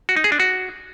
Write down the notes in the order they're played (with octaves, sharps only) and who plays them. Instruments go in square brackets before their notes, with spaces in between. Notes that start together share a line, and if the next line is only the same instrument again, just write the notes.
[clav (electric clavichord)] F#4
D#4
G#4
D4
F#4